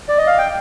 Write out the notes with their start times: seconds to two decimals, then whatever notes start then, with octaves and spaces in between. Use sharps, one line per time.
0.08 D5
0.18 D#5
0.27 F5
0.38 G5